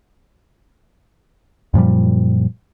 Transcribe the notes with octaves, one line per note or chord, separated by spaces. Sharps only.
F#2 A#2 F3 G3